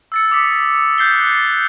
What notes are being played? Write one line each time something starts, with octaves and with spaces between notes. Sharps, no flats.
E6 A6 C#7
D6 D#6 B6
D#6 F#6 G6 A6 C7 G7